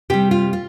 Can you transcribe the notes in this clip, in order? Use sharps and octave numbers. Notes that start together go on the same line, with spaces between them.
C3 G3 G4
F4
F4